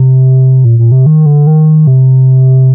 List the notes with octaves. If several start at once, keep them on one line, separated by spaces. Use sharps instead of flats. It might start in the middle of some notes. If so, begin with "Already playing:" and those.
Already playing: C3
A#2
A#2
C3
D#3
D3
D#3
C3